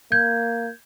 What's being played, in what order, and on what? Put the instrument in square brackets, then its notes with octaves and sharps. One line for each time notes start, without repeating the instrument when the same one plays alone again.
[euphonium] A#3 [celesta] G6 G#6